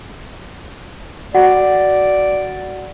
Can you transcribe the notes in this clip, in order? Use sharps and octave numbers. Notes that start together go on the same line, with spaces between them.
F#4 D5 F#5